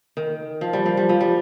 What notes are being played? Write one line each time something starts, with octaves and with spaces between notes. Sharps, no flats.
D#3
F3
G3
F3
G3
F3
G3